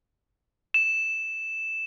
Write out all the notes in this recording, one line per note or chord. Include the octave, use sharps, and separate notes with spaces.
E7